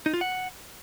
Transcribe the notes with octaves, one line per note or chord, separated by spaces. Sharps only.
D#4
F4
F#5